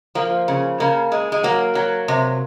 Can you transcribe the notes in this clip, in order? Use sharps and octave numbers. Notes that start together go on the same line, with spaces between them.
F3 A#3
C#3
C#3 A#3
G#3
G#3
F#3 A#3
F#3
C3